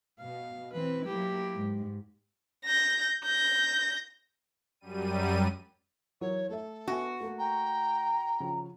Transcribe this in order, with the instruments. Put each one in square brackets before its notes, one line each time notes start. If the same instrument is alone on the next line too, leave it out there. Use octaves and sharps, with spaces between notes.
[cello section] B2 [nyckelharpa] F5
[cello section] E3 C4 [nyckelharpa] B4
[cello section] F#3 A#3 E4 [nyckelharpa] G4
[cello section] G#2
[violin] G6 A#6
G6 A#6
[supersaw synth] F#2 G3 D#7
[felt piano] E3 F#3 A#4 [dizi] C#5
[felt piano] A3 E5 [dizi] A4
[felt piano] B3 E5 G#5 [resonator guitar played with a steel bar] F#4
[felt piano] A3 A#3
[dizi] G5 [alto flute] A#5
[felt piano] C#3 F3